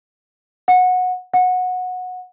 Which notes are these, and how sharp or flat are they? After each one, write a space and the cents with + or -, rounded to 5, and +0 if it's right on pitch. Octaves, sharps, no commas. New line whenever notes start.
F#5 -15
F#5 -15